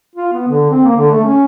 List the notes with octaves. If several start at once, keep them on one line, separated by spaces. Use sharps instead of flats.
F4
B3
D3
C4
A#3
D3
A3
C#4